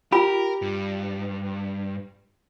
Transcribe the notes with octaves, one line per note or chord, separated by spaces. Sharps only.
F4 G4 A#4 B5
G2